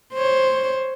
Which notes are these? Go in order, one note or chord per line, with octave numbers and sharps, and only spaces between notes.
C5 C#5